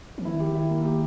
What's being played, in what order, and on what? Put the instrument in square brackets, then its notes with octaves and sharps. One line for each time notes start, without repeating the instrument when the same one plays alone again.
[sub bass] E3
[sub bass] D#3 [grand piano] E4
[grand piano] G4
E4
A#3
G4